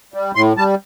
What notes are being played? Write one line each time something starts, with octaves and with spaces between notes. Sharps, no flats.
G3
A2 C6
G3 A5